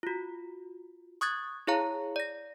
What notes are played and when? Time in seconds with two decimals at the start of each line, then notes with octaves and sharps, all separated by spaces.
0.03 F4 F#4
1.21 C#6 D#6 F#6 G#6 A6
1.67 E4 G#4 C#5 F5 A#5
2.16 D5 A#6